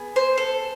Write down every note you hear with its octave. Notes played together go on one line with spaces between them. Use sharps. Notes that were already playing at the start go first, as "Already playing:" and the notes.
Already playing: B3 G#4
C5
A4